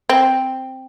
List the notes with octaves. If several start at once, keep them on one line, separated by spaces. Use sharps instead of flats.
C4